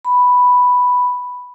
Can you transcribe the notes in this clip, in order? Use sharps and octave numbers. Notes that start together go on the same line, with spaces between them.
B5